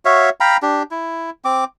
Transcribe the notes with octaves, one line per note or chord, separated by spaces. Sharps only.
F#4 C#5 E5 F5
F5 G5 A#5 B5
D4 G4
E4
C4 D6